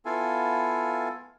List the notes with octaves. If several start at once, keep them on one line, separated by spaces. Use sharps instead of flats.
B3 E4 F4 A4 F5 G#5